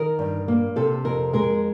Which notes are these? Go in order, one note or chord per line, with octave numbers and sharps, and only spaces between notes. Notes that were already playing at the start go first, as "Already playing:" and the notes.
Already playing: D#3 A#4
G2
A#3
C3 A4
F2 A#4
G#3 A#4